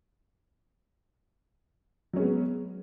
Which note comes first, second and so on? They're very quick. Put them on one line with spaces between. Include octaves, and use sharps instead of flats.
F#3 C#4 G#3 B3